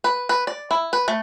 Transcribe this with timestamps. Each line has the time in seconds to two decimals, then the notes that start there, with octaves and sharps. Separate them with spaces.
0.04 B4
0.29 B4
0.47 D5
0.71 E4
0.93 B4
1.08 A3